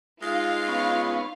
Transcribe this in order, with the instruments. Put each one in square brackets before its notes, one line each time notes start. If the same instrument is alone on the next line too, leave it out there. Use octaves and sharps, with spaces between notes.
[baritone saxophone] G#3 [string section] D#4 F4 F5
[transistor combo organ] B3 C#4